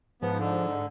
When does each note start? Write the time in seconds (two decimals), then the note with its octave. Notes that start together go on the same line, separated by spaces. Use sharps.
0.22 G#2 F3 B3
0.38 D3